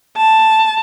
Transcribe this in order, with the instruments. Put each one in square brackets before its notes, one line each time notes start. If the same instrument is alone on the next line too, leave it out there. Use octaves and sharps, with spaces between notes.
[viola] A5